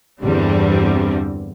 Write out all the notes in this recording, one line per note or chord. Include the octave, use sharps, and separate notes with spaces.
E2 G2 D3 G3 C4